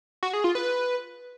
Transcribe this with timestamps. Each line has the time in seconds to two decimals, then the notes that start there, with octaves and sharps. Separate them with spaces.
0.23 F#4
0.33 G#4
0.44 F4
0.55 B4